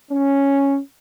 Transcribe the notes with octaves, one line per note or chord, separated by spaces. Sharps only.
C#4